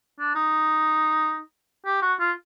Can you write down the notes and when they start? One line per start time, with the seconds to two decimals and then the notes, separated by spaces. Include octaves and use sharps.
0.20 D4
0.35 D#4
1.86 G4
2.02 F#4
2.20 F4